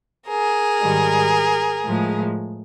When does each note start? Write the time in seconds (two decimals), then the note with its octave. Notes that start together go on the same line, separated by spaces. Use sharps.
0.29 G#4 A#4
0.80 G#2 D#3 G3
1.84 A2 F3 G#3